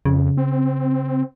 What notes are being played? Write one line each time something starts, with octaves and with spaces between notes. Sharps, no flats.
F2 C#3
C4